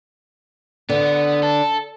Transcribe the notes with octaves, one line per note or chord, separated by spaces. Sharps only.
D3 B3
A4